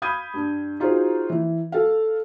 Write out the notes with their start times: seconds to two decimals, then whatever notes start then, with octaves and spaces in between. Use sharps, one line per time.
0.02 F5 B5 D#6 G6 G#6 D#7
0.34 G2
0.80 D#4 F4 F#4 G#4 C5
1.30 E3
1.72 A4 F5